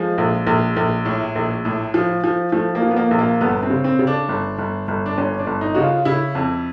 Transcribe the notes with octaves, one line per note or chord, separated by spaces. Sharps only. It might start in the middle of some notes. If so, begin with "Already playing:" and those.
Already playing: F3 G#3
A#1
A#1
A#1
A2
A#1
A2
F3
F3
F3 A3
A#3
F3
B3
A#3
A#1
A#3
G1 B3
C4
C#3
C4
C#3
D4
G1
G1
G1
D4
G1 C#4
D4
G1
D#4
C#3 F#4
F4
C#3 E4
F2